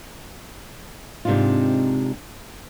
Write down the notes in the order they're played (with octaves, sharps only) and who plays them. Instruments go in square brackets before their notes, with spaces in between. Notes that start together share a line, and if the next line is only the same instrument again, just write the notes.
[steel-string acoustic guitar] G#2 C3 C4 D4 D#4 F4